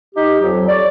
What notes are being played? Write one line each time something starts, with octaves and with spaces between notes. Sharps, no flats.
D#4 G4
F2 F#3
C#5 D5